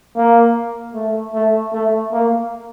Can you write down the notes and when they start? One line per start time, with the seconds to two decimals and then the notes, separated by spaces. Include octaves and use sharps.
0.17 A#3
0.95 A3
1.34 A3
1.73 A3
2.12 A#3